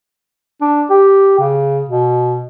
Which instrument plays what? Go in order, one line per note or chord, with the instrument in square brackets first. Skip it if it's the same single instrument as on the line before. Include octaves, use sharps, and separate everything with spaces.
[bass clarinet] D4
G4
C#3
B2